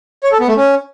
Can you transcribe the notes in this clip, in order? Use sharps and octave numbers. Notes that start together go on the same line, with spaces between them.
C#5
A4
B3
A3
C#4